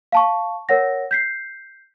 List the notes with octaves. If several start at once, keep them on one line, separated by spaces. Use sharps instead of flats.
F5 A5 C#6
A#4 C#5 F#5 A#6
G6 B6 C7